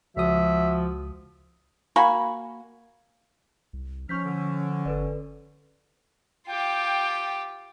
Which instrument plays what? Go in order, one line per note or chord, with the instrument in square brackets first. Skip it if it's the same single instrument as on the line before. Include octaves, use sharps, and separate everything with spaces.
[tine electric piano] C#2 D#6 [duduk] F3 [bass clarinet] F#4 [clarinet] E5
[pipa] A#3 F#4 G#5 B5
[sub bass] C2
[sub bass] F3 [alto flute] C#4 [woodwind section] D#4 F6 [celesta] C#6 G6 B6
[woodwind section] D3
[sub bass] G1 [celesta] A4 B4 D5
[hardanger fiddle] F4 G4 [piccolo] G5